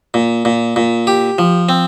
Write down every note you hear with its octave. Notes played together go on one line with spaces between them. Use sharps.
A#2
A#2
A#2
G4
F3
C4